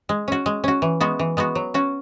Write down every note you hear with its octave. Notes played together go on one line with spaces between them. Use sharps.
G#3
C#4 F#4
G#3
C#4 F#4
E3
G#3 B3 F#4
E3
G#3 B3 F#4
F#3
C#4 F#4